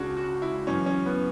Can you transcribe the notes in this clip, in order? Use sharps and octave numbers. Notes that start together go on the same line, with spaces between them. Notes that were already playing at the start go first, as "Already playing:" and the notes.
Already playing: C#2 C#3 C#4 D4 F#4
F#4
E4
F#2 E3 C#4
C#4
B3